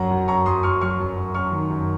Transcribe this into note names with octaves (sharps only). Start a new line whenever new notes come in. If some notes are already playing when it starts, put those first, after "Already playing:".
Already playing: F#2 F#3 F#5 A#5
F#2
F#2 A#5 C#6
F#2 C6 D#6
F#2 C#6 F6
F#3 C#6 F6
F#2
F#2
F#2 C#6 F6
D#3
F#2